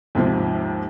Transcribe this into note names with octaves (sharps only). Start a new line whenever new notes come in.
D#2 G#2 C3 F3